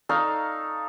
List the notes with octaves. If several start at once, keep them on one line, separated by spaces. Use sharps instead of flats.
D#4 A4 F5 C#6